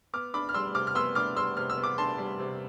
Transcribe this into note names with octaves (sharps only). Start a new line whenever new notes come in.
B3 D6 F6
D4 B5 D6
F6
G3 C6 E6
C3 D6 F6
F6
B3 C6 E6
D4 D6 F6
G3 C6 E6
C3 F6
E6
B3
D6
D4 A5 C6
G3
C3